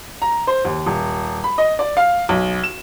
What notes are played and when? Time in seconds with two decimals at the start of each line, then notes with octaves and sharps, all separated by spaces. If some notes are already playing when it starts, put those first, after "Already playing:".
0.22 A#5
0.47 C5
0.65 D#2
0.86 D#1
1.44 B5
1.58 D#5
1.79 D5
1.97 F5
2.29 B1
2.64 E7